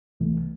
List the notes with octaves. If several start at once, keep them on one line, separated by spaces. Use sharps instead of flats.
C2 C3 E3 A3